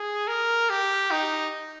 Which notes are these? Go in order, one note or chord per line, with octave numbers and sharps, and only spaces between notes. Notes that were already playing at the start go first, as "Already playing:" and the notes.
Already playing: G#4
A#4
G4
D#4